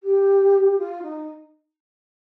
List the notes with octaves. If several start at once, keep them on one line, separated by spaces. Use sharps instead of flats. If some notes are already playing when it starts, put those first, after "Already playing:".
G4
F4
D#4